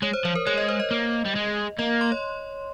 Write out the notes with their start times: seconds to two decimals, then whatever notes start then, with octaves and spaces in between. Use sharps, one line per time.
0.02 G#3 C#5
0.13 C5
0.25 F3 C5
0.35 A#4
0.47 G#3 C#5
0.58 D#5
0.69 C5
0.80 D#5
0.91 A#3
1.25 G3
1.35 G#3
1.78 A#3 D#5
2.01 C6
2.12 C#5